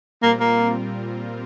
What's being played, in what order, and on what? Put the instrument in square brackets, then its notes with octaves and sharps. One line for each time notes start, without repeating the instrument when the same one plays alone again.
[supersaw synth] A#2 G3 C4 F4 A#4 [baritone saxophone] A#3
[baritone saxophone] A#3